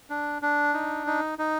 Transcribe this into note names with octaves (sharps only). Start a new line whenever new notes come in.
D4
D4
D#4
D#4
D#4